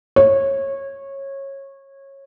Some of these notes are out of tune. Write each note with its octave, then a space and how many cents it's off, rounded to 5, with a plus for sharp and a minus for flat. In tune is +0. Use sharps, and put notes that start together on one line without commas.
C#5 -20